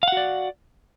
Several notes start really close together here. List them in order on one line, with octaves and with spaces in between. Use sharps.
F5 F#5 F#4 D5